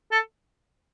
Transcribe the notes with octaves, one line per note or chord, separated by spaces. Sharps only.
A4